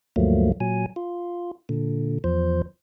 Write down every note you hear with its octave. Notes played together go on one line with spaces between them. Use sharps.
D2 G2 F3 F#3 A3 A#3
A#2 F#3 G#5
F4
A#2 D3
E2 F3 C5